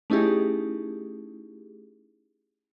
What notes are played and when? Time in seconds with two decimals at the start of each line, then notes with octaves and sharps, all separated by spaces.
0.10 A3 C#4 D#4 E4 G4 G#4